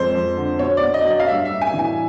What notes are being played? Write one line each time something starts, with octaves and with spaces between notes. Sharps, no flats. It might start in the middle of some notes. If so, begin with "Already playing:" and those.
Already playing: F2 G#3 C5
F2
D3
B2 C#5
D5
B2
D#5
F#3
D#5
F5
G2 E5
E5
G2
G#5
E3
G#5